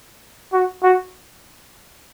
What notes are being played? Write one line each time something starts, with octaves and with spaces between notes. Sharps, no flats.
F#4
F#4